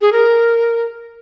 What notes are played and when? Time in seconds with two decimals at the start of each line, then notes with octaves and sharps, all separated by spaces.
0.01 G#4
0.13 A#4